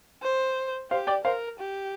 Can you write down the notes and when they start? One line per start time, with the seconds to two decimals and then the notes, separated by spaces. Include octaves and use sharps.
0.23 C5
0.91 G4 C5 F5
1.07 D5 G5
1.24 A#4 C5 F5
1.59 G4